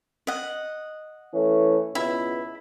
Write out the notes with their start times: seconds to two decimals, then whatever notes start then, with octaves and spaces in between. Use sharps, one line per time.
0.27 D#5 F#5
1.34 E3 A3 C#4
1.95 C#2 B2 E4